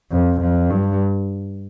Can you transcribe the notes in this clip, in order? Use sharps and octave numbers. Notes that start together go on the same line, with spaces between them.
F2
F2
G2